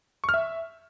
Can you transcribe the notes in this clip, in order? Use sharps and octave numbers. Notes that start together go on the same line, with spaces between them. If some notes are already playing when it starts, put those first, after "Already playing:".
C#6
F6
E5